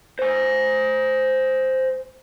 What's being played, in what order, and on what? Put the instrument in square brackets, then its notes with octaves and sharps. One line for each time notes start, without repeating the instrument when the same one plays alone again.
[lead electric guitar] C5 G#5